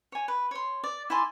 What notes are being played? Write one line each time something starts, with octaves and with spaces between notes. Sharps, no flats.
C#5 G#5
B4
C#5 C6
D5
E4 D5 G#5 C6